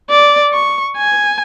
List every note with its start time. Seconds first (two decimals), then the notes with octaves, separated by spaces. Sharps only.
0.10 D5
0.53 C#6
0.97 G#5